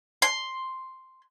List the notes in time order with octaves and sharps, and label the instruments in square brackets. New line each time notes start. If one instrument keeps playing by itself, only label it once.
[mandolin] C6